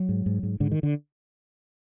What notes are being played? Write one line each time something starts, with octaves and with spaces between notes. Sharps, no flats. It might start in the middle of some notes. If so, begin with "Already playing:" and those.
Already playing: F#3
G#2
G#2
G#2
G#2 D3
D#3
D3